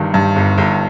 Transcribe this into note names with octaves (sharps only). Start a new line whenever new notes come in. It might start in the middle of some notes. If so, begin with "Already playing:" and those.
Already playing: G1 G2 D#3
G2
G1
G1